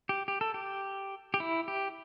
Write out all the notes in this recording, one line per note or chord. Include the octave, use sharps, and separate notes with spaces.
G4
G4
A4
G4
G4
E4
G4